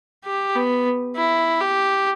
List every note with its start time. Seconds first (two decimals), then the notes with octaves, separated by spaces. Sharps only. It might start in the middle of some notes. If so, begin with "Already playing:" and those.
0.25 G4
0.56 B3
1.16 E4
1.61 G4